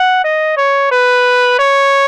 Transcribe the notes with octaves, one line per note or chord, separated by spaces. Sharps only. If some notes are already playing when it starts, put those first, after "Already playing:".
Already playing: F#5
D#5
C#5
B4
C#5